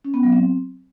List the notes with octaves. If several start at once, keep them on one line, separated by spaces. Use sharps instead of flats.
C#4
B3
F#3
C4